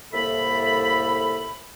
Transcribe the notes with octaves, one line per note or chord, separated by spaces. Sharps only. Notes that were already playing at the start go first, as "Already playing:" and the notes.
C2 A2 A#3 A4 E5 B5